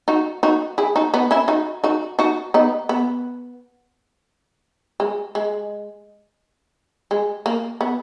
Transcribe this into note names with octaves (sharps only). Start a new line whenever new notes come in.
D#4 F#4
D#4 F#4
E4 G#4
D#4 F#4
B3 D#4
C#4 E4
D#4 F#4
D#4 F#4
D#4 F#4
B3 D#4
B3
G#3
G#3
G#3
A#3
B3